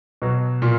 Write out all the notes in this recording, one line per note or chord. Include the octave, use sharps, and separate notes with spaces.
B2 F#3
A#2